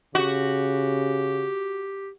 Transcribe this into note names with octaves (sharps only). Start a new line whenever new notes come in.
C#3 F#4 G4